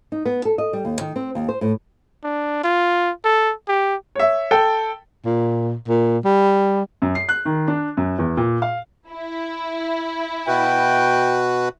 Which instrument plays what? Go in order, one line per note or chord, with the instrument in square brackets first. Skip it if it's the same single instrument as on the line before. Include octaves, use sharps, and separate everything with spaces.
[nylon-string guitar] D#4
B3
A4
D#5
G3
D#2
D#3
C4
D#2
C5
A2
[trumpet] D4
F4
A4
G4
[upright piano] C#5 E5
A4 G5
[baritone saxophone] A#2
A#2
G3
[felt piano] F#2
C7
F#6
D#3
D4
F#2
E2
A#2
F5
[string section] E4
[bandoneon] B2 F#4 B4 [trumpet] G5